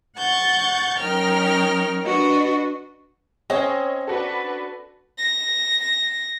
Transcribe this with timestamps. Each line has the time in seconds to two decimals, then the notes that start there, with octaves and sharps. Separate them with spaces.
0.17 F#5 C#6 G6 A6
0.98 F#3 C#4 D#4 A#4 G5 F6
2.03 D4 F#4 B4 D#5
3.50 C4 C#4 G#4 C5 C#5 D#5
4.07 D4 F#4 A4 B4
5.18 A#6